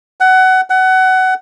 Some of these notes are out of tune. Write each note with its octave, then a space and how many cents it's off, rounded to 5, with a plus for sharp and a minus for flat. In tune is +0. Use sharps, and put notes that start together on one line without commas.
F#5 +20
F#5 +20